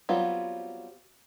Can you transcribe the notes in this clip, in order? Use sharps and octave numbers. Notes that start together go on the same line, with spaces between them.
F#3 G3 B3 C4 F4